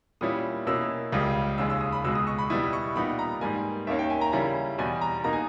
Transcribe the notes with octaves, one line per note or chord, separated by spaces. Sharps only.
A#2 G3 C#4 E4 D#6
B2 A#3 C#4 E4 E6
C#2 C#3 G3 D#6
D#2 C#3 G#3 E6
E6
D#6
B5
C#2 B2 G#3 E6
D#6
C#6
B5
B2 G3 B3 E4 D#6
D#6
C#6
A#2 G3 B3 D#4 B5
A#5
G#2 G3 A#3 G#5
D#2 D#3 A#3 C#4 E5
G5
G#5
A#5
C#3 G3 C#4 E4 A#5
E2 B2 G3 G#5
A#5
B2 A#3 D#4 A#5
G#5